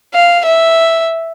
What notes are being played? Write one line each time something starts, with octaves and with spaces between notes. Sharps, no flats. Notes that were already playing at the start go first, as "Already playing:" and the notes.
F5
E5